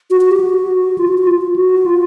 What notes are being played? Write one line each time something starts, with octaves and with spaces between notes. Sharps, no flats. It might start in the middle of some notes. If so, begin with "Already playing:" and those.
F#4
F#4
G4
F#4
F4
F#4
F#4
F4
F4
F#4
F4